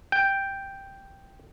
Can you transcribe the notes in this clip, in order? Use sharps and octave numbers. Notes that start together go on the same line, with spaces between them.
G5